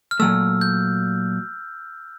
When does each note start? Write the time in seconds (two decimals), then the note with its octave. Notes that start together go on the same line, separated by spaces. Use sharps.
0.11 F6
0.20 A#2 F#3 A3 E6
0.61 G6